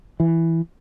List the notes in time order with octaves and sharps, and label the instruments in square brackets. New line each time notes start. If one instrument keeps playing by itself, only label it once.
[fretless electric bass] E3